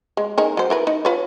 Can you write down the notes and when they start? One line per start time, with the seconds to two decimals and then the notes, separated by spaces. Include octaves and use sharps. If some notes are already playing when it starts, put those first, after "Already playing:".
0.17 G#3
0.38 D#4 G#4 A#4
0.57 F#3 C5
0.70 E4 A#4 B4
0.87 D#4
1.05 F4 B4 C#5